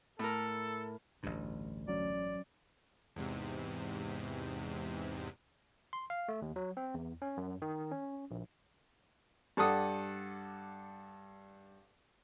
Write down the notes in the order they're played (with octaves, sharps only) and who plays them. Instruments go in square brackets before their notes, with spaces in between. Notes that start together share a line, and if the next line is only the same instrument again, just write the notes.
[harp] A2 A#4 [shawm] A4
[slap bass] A1 G2 [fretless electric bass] D2
[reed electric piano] F#3 C#4 [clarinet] D5
[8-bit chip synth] E2 G#2 C3
[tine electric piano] C6
F5
A3
D#2
F#3
C4
E2
C#4
F#2
D#3
C#4
A#1
[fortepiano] G2 A4 D5 F#5 D#6